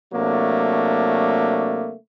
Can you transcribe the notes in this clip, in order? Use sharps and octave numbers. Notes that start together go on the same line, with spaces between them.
C3 F#3 A3 A#3 D4